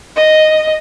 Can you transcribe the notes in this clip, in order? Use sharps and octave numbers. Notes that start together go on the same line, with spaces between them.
D#5